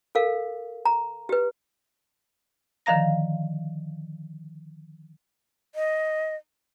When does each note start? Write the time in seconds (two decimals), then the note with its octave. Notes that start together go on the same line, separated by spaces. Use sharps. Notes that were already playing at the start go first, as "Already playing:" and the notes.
0.15 A4 A#4 F5
0.85 A#5
1.29 G4 B4
2.86 D3 D#3 F3 F5 A#5 A#6
5.75 D#5